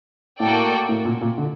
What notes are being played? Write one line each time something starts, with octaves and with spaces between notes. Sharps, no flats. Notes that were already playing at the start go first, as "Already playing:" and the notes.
A2 A#3 F#4 A4 D5 G5
A2
A#2
A#2
D3